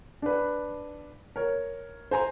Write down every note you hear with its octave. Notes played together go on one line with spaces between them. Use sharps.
D4 B4
A#4 C#5
C5 G#5 A#5 C6